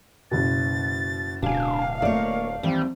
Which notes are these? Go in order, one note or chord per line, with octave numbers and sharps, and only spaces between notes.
F#1 B2 A6
D1 B2 D4 F5 G#5
A3 A#3 F4 C#5 D5
D#2 E3 G3 C4